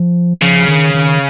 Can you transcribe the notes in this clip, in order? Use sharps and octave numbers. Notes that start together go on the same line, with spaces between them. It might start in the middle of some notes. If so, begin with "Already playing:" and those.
Already playing: F3
C#3 F3
D#3
D#3